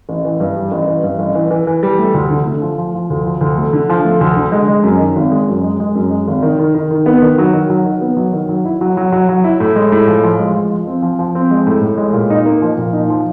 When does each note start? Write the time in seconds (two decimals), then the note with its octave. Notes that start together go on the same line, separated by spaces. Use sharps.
0.09 A1
0.25 E3
0.40 G2
0.56 G3
0.71 A1
0.87 E3
1.03 G2
1.19 A1
1.35 E3
1.51 E3
1.67 E3
1.83 G3
1.99 A3
2.14 D2
2.30 D3
2.46 A3
2.62 F3
2.78 F3
2.94 F3
3.10 D2
3.26 F3
3.41 D2
3.58 A3
3.73 D3
3.89 F3
4.05 A3
4.21 D2
4.36 D3
4.52 G#3
4.68 G#3
4.84 F#2
5.00 D#3
5.16 G#1
5.32 G#3
5.48 F#2
5.64 G#3
5.80 G#3
5.95 F#2
6.11 G#3
6.27 G#1
6.43 D#3
6.59 D#3
6.75 D#3
6.91 D#3
7.06 B3
7.22 D#3
7.38 F#3
7.53 D#3
7.70 F#3
7.85 D#3
8.01 B3
8.17 F#3
8.33 D#3
8.49 F#3
8.65 E4
8.81 F#3
8.97 F#3
9.12 F#3
9.29 F#3
9.44 E4
9.60 A2
9.76 G#3
9.92 A2
10.07 F3
10.23 F3
10.39 G#3
10.55 F3
10.71 F3
10.87 C4
11.02 F3
11.19 F3
11.35 C4
11.51 G#3
11.67 A2
11.82 A2
11.97 G#3
12.13 A#2
12.30 D#4
12.45 A#3
12.62 F3
12.78 A#2
12.93 D#4
13.10 F3